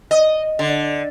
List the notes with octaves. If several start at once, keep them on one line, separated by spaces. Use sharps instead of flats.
D#5
D3